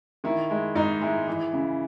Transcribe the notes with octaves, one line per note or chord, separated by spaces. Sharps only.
D#3 E4
G#3 E4
G#2 D#4
G#3 E4
E3
C#3